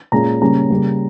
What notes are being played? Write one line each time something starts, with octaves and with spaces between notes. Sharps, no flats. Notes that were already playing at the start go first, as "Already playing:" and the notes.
A#2 G#3 C#4 A#5
C#3 G3 A#3 C#4 A#5
C#3 G3 A#3